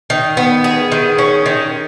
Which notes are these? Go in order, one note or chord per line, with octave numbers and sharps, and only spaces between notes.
D#3
B3
G#4
D#3
C#4
D#3